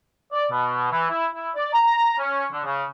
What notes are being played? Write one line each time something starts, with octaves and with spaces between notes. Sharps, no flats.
D5
B2
E3
E4
E4
D5
A#5
C#4
D3
C#3